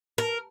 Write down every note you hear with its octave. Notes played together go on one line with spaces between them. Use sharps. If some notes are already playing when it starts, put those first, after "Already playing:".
A#4